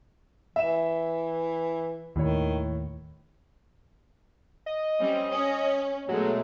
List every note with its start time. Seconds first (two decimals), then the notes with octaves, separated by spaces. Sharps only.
0.56 E3 E5 E7
2.16 D#2 A2 D#3 C#5
4.66 D#5
5.00 G3 C4 C#4
5.32 C#4
6.09 B2 F#3 G#3 A3